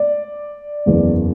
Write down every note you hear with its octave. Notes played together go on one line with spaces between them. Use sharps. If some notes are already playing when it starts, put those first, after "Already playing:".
Already playing: D5
F#1 E2 B2